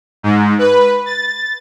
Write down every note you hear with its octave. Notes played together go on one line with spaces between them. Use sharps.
G#2
B4
A6